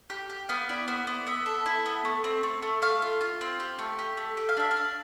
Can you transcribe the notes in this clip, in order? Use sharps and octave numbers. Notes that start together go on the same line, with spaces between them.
G4
G4
B3 F5
E4 D5
B3 C5
B3 D5
B3 E5
A4
E4
B3
A3
C4
A3
A3
A3 F5
F4
F4
C4
G4
A3
G4
A3
G4 G5
F5
D4 E5
F5
D4